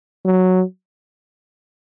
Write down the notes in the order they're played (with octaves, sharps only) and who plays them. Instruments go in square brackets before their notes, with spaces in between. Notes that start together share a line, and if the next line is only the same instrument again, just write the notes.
[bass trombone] F#3